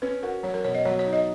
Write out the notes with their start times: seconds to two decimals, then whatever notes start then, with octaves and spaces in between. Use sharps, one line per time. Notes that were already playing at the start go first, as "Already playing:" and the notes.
0.02 C#4 B4
0.23 F#4 A#4
0.43 F#3 C#5
0.54 A#4
0.64 B2 C#5
0.75 D#5
0.85 F#3 C#5
0.99 C#5
1.07 D#4
1.13 D#5